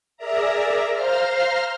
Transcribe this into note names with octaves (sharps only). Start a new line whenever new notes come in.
G#4 A#4 D5 E5 A#5
C5 F5 A#5 C6 F6